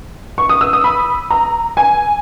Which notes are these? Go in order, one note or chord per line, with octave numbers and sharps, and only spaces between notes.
C#6
D#6
E6
D#6
B5
A#5
G#5